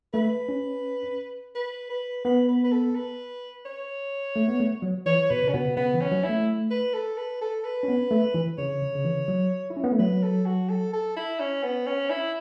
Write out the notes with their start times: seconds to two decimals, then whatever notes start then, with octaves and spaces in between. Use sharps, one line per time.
0.13 A3 B4
0.49 C#4
1.55 B4
1.90 B4
2.25 B3 B4
2.48 B4
2.64 B4
2.72 A4
2.96 B4
3.65 C#5
4.36 A3
4.48 B3
4.60 A3
4.82 F#3
5.06 E3 C#5
5.30 B2 B4
5.42 C#3
5.48 C#4
5.53 B2 B3
5.77 C#3 B3
5.94 E3
6.01 C#4
6.12 F#3
6.24 E4
6.29 A3
6.71 B4
6.94 A4
7.18 B4
7.41 A4
7.64 B4
7.83 C#4
7.88 B3
8.11 A3
8.34 E3
8.58 C#3 C#5
8.82 C#3
8.95 C#3
9.05 E3
9.28 F#3
9.70 E4
9.77 C#4
9.84 B3
9.92 A3
9.99 F#3 B4
10.23 A4
10.46 F#4
10.69 A4
10.93 A4
11.16 E4
11.40 C#4
11.63 B3
11.87 C#4
12.10 E4